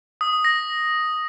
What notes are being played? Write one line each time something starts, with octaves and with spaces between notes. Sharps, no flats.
D#6
A#6